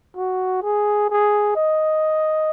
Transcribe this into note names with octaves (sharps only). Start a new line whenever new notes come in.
F#4
G#4
G#4
D#5